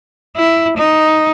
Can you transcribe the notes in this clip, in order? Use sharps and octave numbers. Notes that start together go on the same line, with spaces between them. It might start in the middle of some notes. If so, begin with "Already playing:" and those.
E4
D#4